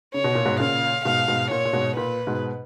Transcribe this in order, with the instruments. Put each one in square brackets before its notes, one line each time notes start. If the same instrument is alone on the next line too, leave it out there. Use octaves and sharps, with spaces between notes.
[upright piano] C#3 [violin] C#5
[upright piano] B2
A#2
G#2 B2
[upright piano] A#2 C#3 [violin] F5
[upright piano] G#2 B2 [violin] F5
[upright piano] G#2 B2
[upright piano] A#2 [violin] C#5
[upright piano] A#2
G#2 B2
[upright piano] A#2 [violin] B4
[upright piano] G#2 B2